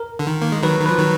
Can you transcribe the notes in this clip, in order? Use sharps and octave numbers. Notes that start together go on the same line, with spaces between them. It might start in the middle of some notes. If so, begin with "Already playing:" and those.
Already playing: A#4
D3
D#3
A#3
G#3
D#3 F#3 B4
D#3
F3 B4
D#3 F#3